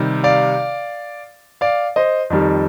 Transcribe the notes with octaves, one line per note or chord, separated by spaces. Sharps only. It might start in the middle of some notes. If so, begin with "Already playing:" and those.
Already playing: C3 D#3 G3
D5 F5
D5 F5
C5 D#5
F2 D#3 G3